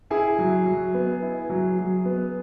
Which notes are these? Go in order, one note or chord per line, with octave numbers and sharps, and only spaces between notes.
E4 G#4
F#3
F#3
B3
E4
F#3
F#3
B3